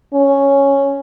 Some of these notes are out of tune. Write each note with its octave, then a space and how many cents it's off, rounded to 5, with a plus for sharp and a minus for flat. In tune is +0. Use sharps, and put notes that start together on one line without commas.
C#4 +0